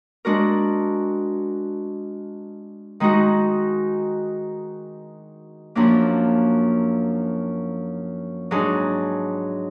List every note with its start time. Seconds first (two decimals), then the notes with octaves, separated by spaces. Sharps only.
0.25 G#3 D4 F#4 A#4
3.00 D#3 G#3 D#4 F#4
5.75 F#2 F3 A#3 D4
8.51 G#2 F#3 D4 G#4